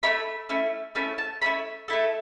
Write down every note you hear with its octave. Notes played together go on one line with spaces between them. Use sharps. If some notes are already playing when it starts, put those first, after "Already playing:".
A3 C#4 E4 B5
A3 C#4 E4
A3 C#4 E4 A5
A5
A3 C#4 E4 B5
A3 E4 A4